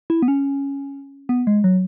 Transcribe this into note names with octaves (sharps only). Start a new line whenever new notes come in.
E4
B3
C#4
B3
G#3
F#3